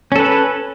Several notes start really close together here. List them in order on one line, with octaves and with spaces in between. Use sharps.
C#4 A4 B4